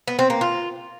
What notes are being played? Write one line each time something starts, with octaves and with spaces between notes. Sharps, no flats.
B3
C4
A#3
F4